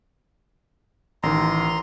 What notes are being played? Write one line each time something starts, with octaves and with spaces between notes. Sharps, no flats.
A1 D#3 A#5 C6